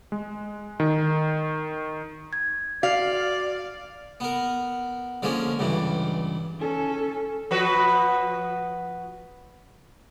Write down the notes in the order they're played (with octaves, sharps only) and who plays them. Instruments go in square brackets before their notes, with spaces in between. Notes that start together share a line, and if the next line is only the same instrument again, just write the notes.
[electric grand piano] G#3
D#3
[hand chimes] G#6
[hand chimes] F#4 [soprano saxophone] D5 [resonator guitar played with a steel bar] F5
[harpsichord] B3 A#4
D3 F3 G#3 A#3 C#4
C#2 G2 E3
[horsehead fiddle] C#4 A4
[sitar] F3 F#4 B4